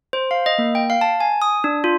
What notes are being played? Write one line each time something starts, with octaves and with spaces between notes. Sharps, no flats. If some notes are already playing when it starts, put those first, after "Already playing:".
C5
F5
D#5
A#3
G5
F5
A5
G#5
D#6
D4
F4